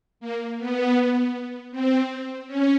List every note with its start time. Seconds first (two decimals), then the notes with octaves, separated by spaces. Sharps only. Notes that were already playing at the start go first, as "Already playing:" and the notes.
0.20 A#3
0.58 B3
1.71 C4
2.47 C#4